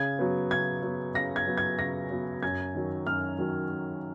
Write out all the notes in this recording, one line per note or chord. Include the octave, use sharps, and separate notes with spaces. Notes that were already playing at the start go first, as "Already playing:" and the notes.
Already playing: C#3 G#6
F#3 B3
C#3 G#6
F#3 B3
C#3 A#6
G#6
F#3 B3
G#6
C#3 A#6
F#3 B3
F#2 G#6
D#3 F#3
F#2 F6
D#3 F#3